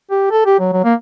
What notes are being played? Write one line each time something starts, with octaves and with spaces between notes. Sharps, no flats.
G4
A4
G4
F#3
F#3
A#3